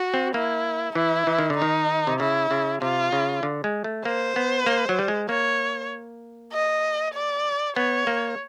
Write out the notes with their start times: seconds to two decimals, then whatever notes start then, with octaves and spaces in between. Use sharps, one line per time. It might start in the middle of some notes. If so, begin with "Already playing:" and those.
Already playing: F#4
0.14 C4
0.34 A#3 E4
0.95 E3 E4
1.27 E3
1.39 D#3
1.50 D3
1.58 D#3 D#4
2.07 C3
2.20 C#3 E4
2.51 C#3
2.82 C3 F4
3.13 C#3
3.43 D3
3.64 G#3
3.84 A3
4.05 A#3 C5
4.36 B3
4.66 A#3
4.89 F#3
4.99 G3
5.08 G#3
5.29 A#3 C#5
6.52 D#5
7.14 D5
7.76 B3 C#5
8.07 A#3